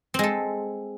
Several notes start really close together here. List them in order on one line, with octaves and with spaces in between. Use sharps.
C4 G#3 A4